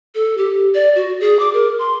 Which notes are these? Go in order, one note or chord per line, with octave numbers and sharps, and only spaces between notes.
A4
G4
D5
F#4
G#4
D6
A#4
C6